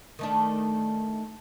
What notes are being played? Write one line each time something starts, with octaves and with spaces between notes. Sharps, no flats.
D#3 A3 D4